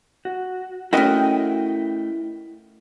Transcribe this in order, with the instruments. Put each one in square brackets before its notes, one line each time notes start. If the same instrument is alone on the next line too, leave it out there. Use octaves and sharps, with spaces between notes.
[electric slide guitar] F#4
[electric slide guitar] A3 G5 [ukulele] C#4 D#4 F#4 [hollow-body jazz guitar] E4 A#4 D#5